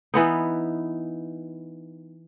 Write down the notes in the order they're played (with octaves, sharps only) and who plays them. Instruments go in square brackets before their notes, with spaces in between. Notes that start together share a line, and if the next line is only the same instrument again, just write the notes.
[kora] E3 B3 D#4